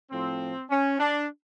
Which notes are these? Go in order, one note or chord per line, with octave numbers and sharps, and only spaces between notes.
A2 F3 C4
C#4
D4